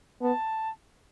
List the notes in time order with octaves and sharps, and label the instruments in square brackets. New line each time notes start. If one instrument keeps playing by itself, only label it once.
[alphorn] B3 [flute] A5